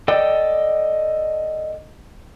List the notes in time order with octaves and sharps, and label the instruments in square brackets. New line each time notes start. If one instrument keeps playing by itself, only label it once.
[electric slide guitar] A4 D5 D#5 G5